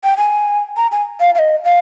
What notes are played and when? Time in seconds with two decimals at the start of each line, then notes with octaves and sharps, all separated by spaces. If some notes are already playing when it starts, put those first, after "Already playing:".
0.04 G5
0.17 G#5
0.77 A#5
0.92 G#5
1.20 F5
1.35 F5
1.39 D#5
1.64 F5